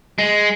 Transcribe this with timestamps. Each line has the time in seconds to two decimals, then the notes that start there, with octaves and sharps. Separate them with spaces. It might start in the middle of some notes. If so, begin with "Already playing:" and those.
0.18 G#3